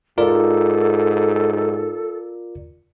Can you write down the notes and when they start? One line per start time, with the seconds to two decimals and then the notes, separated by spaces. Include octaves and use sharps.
0.18 G#2 F4 A4 A#4 D5